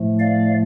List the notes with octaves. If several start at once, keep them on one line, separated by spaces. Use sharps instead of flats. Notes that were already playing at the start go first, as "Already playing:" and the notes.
Already playing: A2 F3 A3
D5 F5